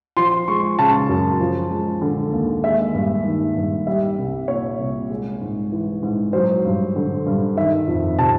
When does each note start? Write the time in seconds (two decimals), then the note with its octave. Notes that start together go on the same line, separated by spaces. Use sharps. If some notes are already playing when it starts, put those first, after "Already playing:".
0.17 F3 C6
0.48 G#3 C#6
0.79 C#3 A5
1.09 F#2
1.40 F3
1.71 G#3
2.02 D3
2.32 D#2
2.64 G#3 E5
2.94 G2
3.25 D#3
3.56 G2
3.87 G3 E5
4.18 C2
4.48 A#2 C#5
4.79 C2
5.10 G#3
5.41 G#2
5.72 E3
6.03 G#2
6.33 F#3 C5
6.65 G2
6.96 D3
7.26 G2
7.57 D#3 E5
7.87 F2
8.18 C3 A5